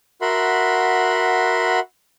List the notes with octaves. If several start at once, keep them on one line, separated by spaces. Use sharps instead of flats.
F#4 A#4 E5 F#5 B5 C6